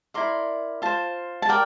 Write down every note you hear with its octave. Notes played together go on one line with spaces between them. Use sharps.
E4 A#4 D5 C6
F4 C5 A5
A5
A#4 D5 G5